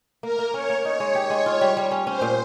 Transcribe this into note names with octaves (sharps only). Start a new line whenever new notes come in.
A#3 A#4
A#3
C#4 C#5
A#3
D#4 C#5
G#3
G4
G#3
F4
G3
G3
C#4
C#4 C5
A#2